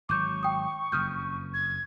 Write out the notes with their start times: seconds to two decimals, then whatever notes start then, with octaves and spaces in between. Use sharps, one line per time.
0.09 G#1 F#3 C#6 D6 G6
0.43 G5 D#6
0.92 F#1 F2 D#6 F6 G6
1.54 G#6